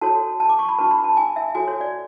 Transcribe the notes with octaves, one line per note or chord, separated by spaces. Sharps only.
F#4 A4 C#5 A5
A5
D6
C#6
B5
D4 F#4 B4 A5
B5
A5
G#5
E5
F#4 A4 C#5 G#5
C#5
D5